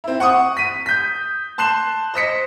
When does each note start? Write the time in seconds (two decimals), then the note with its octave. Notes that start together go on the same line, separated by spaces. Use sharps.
0.04 C4 E4
0.20 F#5 C#6 D#6
0.57 B6 D#7
0.86 G6 B6
1.58 A5 C6 F#6 C7 E7
2.14 C5 D#5 B6 C#7